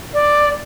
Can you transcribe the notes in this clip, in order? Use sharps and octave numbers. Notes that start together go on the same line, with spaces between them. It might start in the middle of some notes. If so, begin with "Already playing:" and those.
D5